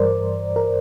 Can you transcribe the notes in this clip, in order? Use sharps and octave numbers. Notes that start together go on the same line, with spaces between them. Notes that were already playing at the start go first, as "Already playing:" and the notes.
Already playing: G2 E3 G3 A#4 C5 D5
A#4